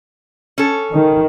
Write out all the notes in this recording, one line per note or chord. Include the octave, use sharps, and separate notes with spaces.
C#4 A4
D#3